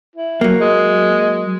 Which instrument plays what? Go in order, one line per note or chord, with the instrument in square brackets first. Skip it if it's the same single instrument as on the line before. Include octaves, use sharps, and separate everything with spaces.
[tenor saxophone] E4
[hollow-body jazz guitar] F#3 A#3
[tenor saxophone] G#3